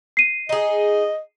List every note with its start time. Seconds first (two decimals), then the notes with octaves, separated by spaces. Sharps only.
0.17 C7 D#7
0.49 D#4 G#4 D#5